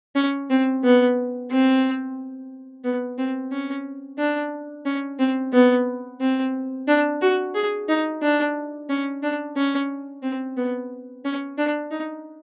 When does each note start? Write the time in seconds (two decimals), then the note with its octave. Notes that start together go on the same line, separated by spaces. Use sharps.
0.15 C#4
0.50 C4
0.83 B3
1.50 C4
2.84 B3
3.17 C4
3.52 C#4
4.18 D4
4.86 C#4
5.19 C4
5.53 B3
6.21 C4
6.88 D4
7.21 F#4
7.55 G#4
7.88 D#4
8.22 D4
8.89 C#4
9.23 D4
9.56 C#4
10.23 C4
10.57 B3
11.24 C#4
11.57 D4
11.91 D#4